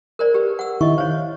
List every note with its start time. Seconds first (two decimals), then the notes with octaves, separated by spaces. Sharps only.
0.19 A#4 C5 D5
0.34 G4 B4
0.59 F#5 E6
0.81 D#3 E4 D#5 C#6
0.98 C5 C#5 F5